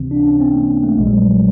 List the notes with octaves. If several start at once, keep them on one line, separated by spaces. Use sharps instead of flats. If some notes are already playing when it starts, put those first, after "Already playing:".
Already playing: C#2 C3 E3 C4
D4
C#4
C4
A#3
A3
A#1 A#2 G#3
G3
F#3
F#3